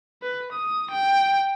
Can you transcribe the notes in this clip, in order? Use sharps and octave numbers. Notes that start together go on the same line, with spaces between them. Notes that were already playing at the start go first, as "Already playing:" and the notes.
B4
D#6
G5